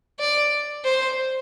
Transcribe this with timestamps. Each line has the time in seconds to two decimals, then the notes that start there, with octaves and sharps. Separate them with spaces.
0.19 D5
0.84 C5